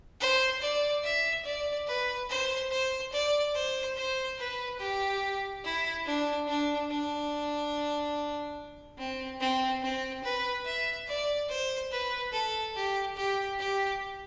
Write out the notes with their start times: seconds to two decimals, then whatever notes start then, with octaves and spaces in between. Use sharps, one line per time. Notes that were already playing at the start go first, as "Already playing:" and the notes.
0.20 C5
0.61 D5
1.04 E5
1.45 D5
1.87 B4
2.29 C5
2.71 C5
3.12 D5
3.55 C5
3.97 C5
4.39 B4
4.80 G4
5.64 E4
6.06 D4
6.48 D4
6.90 D4
8.98 C4
9.41 C4
9.83 C4
10.24 B4
10.65 E5
11.07 D5
11.49 C5
11.92 B4
12.33 A4
12.76 G4
13.16 G4
13.59 G4